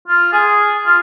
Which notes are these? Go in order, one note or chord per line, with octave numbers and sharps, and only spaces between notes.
F4
G#4
F4